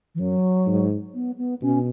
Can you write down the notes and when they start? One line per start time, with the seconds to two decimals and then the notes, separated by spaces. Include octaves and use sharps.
0.15 E3
0.19 F#2 F#3
0.67 G#2
1.15 B3
1.38 B3
1.62 B2 C#4